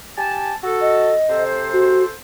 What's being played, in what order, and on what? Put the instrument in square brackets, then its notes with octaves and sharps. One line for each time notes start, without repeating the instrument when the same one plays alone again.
[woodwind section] G4 G#5 A5
F#4 A4
[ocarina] D#5
[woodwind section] C3 A4 C5
[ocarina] F#4